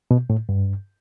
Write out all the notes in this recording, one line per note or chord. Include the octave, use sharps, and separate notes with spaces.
B2
A2
G2